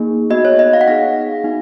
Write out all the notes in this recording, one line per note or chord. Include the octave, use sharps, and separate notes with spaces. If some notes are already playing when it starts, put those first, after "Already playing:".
Already playing: A#3 D#4 G#4
B3 D#4 F#4 D#5
C#5
D#5
F5
F#5
B3 D#4 G#4 F5
B3 D#4 F#4